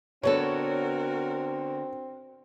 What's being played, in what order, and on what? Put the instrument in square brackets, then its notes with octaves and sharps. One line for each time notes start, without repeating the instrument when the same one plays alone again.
[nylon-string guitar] D3 B3 A4 [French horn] C4 [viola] F#4 A#4 [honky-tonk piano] C#5